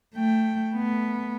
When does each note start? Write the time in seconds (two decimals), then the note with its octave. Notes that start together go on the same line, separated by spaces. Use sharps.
0.15 A3 G5
0.75 A3 B3